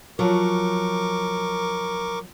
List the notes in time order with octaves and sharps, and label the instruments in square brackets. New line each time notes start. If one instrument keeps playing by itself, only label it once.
[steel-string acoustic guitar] F3 F#3 [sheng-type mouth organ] A#4 C#6 D6